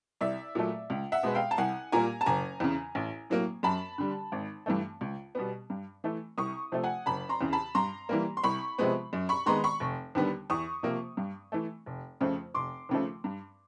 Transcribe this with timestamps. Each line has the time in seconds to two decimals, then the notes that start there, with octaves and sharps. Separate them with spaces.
0.21 C2 D5 E5
0.55 A#2 F#3 A3
0.90 C#2
1.12 E5 F#5
1.23 B2 G#3 B3
1.35 F5 G5
1.51 A5
1.58 C2 F#5 G#5
1.92 A#2 G3 A#3 G#5 A#5
2.21 A5
2.26 F#1 G#5 A#5
2.60 E2 C#3
2.95 A1
3.30 A2 F#3 A#3
3.63 F#2 A5 B5
3.98 D3 G3
4.32 G#1
4.66 G2 E3 A3
5.01 C#2
5.35 B2 G3 B3
5.70 G2
6.04 E3 A3
6.38 C2 C#6 D#6
6.72 C3 F3 A3
6.83 F#5 G#5
7.06 F#1 A5 B5
7.29 A#5 C6
7.41 E2 C#3
7.53 A5 B5
7.75 G2 A#5 C6
8.09 E3 G3 A#3
8.37 C6
8.44 C2 B5 C#6
8.78 C3 F3 G#3 B3
9.13 F#2
9.29 B5 C#6
9.46 D#3 G#3 B3 A#5 C6
9.64 B5 C#6
9.80 F1
10.15 D#2 D3 G3 B3
10.50 E2 C#6 D#6
10.83 C3 F3 A#3
11.17 G2
11.52 E3 A3
11.86 F1
12.21 F2 C#3 F3 A3
12.54 F1 C6 D6
12.89 D#2 C#3 F3 A3
13.24 G2